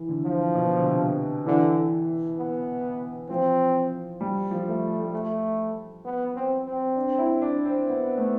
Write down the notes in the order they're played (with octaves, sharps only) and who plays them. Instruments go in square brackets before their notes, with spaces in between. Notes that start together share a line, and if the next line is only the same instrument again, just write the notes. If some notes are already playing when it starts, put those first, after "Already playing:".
Already playing: [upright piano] E3
D3
[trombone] F3
[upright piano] B2
D3
C3
[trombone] D3 [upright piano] E3
[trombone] B3
[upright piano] F3 [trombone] C4
[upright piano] G3
F3
[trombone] A3
A3
B3
C4
C4
[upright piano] D4
E4
D4
C4
[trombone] B3 [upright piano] C4
[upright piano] A3